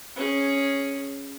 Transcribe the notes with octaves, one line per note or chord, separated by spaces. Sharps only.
C#4 G#4